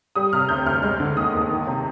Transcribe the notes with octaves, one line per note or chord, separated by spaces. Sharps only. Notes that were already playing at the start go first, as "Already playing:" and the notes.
G3 D#6
C3 F6
D2 G6
D2 F6
G#3 F6
D3
D#2 D#6
D#2
D#3
C3